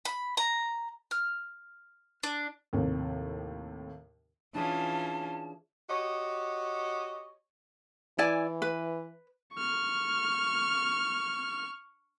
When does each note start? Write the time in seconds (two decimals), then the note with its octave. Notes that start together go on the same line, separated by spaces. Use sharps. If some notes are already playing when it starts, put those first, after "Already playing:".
0.05 B5
0.37 A#5
1.11 F6
2.23 D4
2.73 D#2 A2 C3
4.55 E3 C#4 D4 F4 G#4 A5
5.89 F#4 G4 C#5 D#5
8.18 E3 E4 D5 G#5
8.62 B4
9.54 C#6 F6